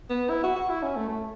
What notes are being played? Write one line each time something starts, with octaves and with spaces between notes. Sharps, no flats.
B3
E4
F#4
F#4
E4
C#4
A3
A3